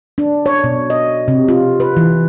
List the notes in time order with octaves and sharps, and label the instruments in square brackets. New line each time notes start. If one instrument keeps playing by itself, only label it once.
[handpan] D4
C#5
B2
D#5
C3
F4
B4
E3